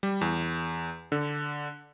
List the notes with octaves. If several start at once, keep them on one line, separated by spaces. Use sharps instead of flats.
G3
E2
D3